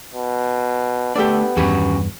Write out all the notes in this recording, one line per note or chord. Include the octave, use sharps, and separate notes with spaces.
B2
A3 B3 D4 G4 A4 D5
E2 G2 D#3 C#4 F#4 G4 B4